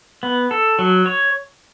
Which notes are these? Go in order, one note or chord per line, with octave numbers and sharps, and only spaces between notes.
B3
A4
F#3
C#5